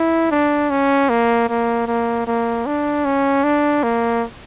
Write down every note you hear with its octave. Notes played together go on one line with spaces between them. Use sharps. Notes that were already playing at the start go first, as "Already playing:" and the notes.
Already playing: E4
D4
C#4
A#3
A#3
A#3
A#3
D4
C#4
D4
A#3